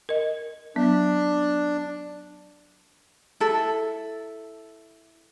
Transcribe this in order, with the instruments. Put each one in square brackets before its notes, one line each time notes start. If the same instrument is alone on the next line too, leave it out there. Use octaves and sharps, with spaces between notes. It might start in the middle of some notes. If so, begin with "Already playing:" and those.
[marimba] A#4 D#5
[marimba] F#3 B3 [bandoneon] D4
[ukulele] E4 A4